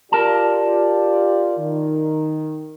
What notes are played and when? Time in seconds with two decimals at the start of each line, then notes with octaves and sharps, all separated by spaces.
0.12 F4 G4 A#4 D5 A5
1.59 D#3